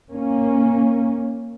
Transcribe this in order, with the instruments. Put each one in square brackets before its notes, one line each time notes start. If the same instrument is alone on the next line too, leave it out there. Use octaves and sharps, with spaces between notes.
[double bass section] A#3 C#4